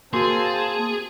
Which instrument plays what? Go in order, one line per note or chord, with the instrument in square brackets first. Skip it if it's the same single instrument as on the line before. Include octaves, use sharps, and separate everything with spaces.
[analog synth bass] A#3 [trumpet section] C4 A5 [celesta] F#4 C6 [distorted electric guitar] G#4